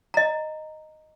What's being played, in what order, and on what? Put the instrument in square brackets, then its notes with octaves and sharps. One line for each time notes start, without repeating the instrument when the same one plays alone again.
[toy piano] D#5 A#5